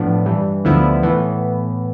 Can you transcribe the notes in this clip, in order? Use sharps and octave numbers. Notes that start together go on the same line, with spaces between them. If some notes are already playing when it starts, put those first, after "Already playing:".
Already playing: A2 F3 B3 D4
G2 E3 G3
D2 D3 F3 B3 E4
A2 E3 B3